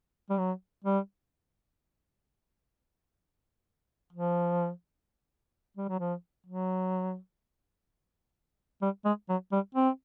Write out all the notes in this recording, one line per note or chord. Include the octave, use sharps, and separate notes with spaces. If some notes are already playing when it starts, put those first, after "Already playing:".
G3
F#3
G3
F3
G3
F#3
F3
F#3
G3
G#3
F#3
G3
C4